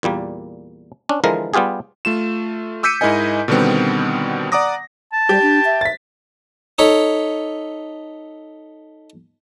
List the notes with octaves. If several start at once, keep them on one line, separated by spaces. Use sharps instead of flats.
E2 A#2 G3 A#3
C#4 D4
D3 E3 F3 G#3 A#4
G3 B3 F4 G4 G#4
A3 F4 E7
D6 E6 G6 B6 C#7 D#7
G#2 E4 A#4 D#5 G#5
B2 D3 D#3 G3 B3 C4
D5 F#5 A#5 D6 D#6 A#6
A5
G3 G4
D4
E5
A6 B6
D#4 A4 C#5 B5